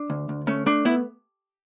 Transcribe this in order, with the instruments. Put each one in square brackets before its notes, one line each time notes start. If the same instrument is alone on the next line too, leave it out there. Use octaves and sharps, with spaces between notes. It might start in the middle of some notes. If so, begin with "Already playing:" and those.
Already playing: [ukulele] D4
[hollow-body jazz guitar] D2
D2
[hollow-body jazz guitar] A3 [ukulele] C#4
[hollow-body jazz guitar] A3 [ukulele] D4
[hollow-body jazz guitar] B3 [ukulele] E4